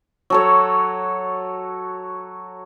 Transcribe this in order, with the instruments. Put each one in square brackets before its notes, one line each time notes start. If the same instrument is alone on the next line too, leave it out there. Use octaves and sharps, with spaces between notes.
[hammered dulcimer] F#3 A4 C#5